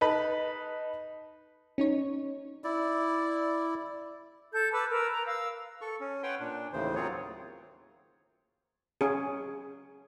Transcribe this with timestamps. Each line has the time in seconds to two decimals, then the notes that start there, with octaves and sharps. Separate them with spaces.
0.01 D#4 B4 A5 B5
1.78 C#4 D#4 C#5
2.64 E4 D5
4.52 A4 G6
4.72 B4 A5 D6 E6
4.92 A#4 B4 E6
5.11 A#5
5.25 F5 E6
5.81 A4 C#6
6.00 C#4
6.23 B4 C#5 F#5 G5 C6
6.40 A#2 D4
6.73 D#2 A2 C#3 E3 C5
6.96 F#3 A#3 C4 F4 G#4 C#5
9.01 C#4 G#4